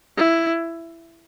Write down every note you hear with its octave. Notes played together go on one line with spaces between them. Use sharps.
E4